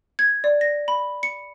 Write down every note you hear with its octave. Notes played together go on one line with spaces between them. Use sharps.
G#6
D5
A#6
B5
C#7